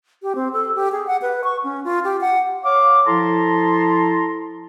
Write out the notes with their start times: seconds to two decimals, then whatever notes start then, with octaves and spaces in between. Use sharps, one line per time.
0.23 G4
0.35 C4
0.53 A4
0.75 G4
0.92 G#4
1.07 F#5
1.22 B4
1.44 C#6
1.64 C#4
1.84 F4
2.04 G4
2.21 F#5
2.63 C#5 F5 D6
3.06 F3 E4 A4 A5 A#5 C6